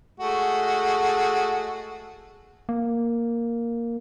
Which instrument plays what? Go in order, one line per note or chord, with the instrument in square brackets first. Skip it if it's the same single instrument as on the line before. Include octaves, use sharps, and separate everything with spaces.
[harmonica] G#3 A3 F#4
[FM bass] A#3